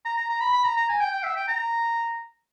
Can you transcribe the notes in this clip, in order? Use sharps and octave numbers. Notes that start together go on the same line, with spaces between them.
A#5
A#5
A#5
B5
B5
A#5
A#5
G#5
G5
G5
E5
G5
A#5